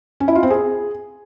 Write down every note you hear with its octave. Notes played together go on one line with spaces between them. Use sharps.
C#4
E4
F4
C4
G#4